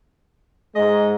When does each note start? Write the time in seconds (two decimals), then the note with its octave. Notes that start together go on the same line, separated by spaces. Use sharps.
0.76 G#2 G#3 D#5